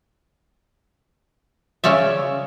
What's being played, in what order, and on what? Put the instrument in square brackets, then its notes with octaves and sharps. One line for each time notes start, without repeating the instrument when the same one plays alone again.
[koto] C#3 C#4 C#5 D5 E5